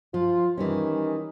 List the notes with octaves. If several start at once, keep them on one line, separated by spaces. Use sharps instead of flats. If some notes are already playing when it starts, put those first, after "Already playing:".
F3 F4
D#3 E3 G3 C#4